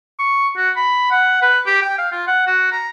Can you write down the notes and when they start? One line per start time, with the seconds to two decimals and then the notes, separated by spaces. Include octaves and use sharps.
0.19 C#6
0.57 F#4
0.76 B5
1.11 F#5
1.42 B4
1.67 G4
1.82 G5
1.98 F5
2.12 F4
2.27 F#5
2.47 F#4
2.72 A#5